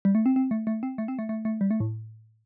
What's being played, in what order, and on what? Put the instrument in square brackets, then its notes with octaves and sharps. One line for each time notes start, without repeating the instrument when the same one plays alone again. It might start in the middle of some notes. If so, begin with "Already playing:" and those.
[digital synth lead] G3
A3
C4
C4
A3
A3
C4
A3
C4
A3
A3
A3
G3
A3
A2